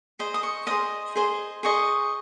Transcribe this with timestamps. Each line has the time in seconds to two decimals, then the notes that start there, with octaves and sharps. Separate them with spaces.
0.19 G#4 C5 D#5
0.34 D#6
0.43 C#6
0.67 G#4 C5 D#5 D#6
1.16 G#4 C5 D#5
1.63 G#4 C5 D#5 C#6